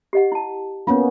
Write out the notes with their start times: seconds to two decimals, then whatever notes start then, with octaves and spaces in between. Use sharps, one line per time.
0.13 G4 D#5 F#5
0.32 E4 A5
0.87 A#3 B3 C#4 F4 C#5